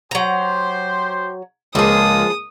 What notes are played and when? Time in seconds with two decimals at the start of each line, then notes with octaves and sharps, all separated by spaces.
0.11 F#3 G4 C5 A#5
1.75 C#2 F3 G#3 A#3 G#4 F5 A5 D#6